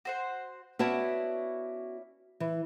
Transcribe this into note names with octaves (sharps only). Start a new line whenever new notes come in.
F#4 C5 F#5
B3 C#4 E4 F#4 D5 A5
E3